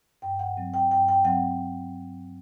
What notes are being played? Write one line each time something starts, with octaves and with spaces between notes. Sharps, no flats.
G2 G5
F#5
F#3 C4
G5
G2 G5
G5
F#3 C4 F#5